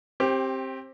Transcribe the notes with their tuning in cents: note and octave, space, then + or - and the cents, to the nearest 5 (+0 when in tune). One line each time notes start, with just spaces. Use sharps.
C4 +20 G4 +0